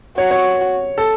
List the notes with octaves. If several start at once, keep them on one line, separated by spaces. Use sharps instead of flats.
F#4 C#5
C#5
A4